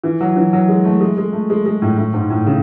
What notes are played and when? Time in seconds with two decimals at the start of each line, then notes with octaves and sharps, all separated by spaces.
0.04 E3
0.21 F#3
0.36 E3
0.53 F#3
0.69 G#3
0.84 A3
1.01 G#3
1.18 G#3
1.33 A3
1.50 G#3
1.66 G#3
1.82 A2
1.97 A2
2.14 G#2
2.30 A2
2.46 C#3